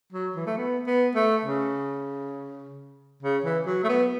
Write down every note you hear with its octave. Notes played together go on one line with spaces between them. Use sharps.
F#3
E3
A3
B3
B3
A3
C#3
C#3
E3
F#3
A3
B3